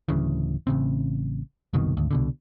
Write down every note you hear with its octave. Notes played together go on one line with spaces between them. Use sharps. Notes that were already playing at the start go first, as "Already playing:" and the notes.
D1 D2 C#3 E3
A1 C#3 C4
F#1 C2 B2 D#3
G#1 D2
C2 B2 D3